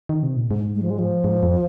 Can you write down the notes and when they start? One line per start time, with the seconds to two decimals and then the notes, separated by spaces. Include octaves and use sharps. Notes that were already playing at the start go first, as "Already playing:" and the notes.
0.09 D#3
0.23 C3
0.37 A#2
0.51 G#2
0.75 G#3
0.82 F3
0.90 G#3
0.99 F3
1.24 G#2
1.43 F2